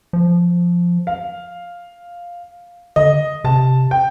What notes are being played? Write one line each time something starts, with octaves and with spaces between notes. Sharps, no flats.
F3
F5
D3 D#5
C3 A5
G5